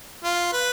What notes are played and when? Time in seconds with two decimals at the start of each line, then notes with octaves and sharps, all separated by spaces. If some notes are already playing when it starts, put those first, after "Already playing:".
0.24 F4
0.53 B4